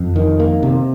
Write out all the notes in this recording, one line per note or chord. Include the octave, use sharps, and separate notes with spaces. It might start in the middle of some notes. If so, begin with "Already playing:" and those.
Already playing: F2
D#3
A#3
C3